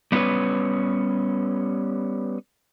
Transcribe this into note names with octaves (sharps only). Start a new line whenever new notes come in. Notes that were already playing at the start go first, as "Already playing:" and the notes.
G3 B3 C#4 D#4 B4 C#5